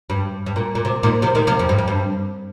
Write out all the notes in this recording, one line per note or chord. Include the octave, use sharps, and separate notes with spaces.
G2
G2
A#2
A#2
C3
A#2 D#3
C3 F3
A#2 D#3
C3 F3
F2
G2
F2
G2